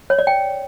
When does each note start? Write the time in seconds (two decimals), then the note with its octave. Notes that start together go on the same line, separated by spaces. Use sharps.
0.10 C#5
0.19 D5
0.27 G5